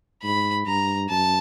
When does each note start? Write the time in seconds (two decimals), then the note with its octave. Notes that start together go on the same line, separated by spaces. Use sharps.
0.23 G#2 B5
0.66 G2 A#5
1.09 F#2 A5